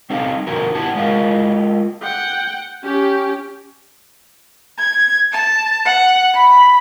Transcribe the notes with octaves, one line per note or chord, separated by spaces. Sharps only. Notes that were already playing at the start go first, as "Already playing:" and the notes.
G3 C4 D#4 A4 F5
F2 B2 D3 F3 F#4 A#4
G2 B3 E4 G4 F#5 A5
G#3 A#3 F4 A#4 D#5 F5
F#5 G5
C#4 G4
G#6
A5
F#5
B5